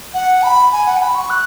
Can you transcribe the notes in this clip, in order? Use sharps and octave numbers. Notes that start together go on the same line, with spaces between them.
F#5
B5
G#5
F#5
G#5
B5
C#6
F#6